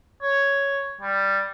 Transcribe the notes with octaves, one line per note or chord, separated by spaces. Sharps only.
C#5
G3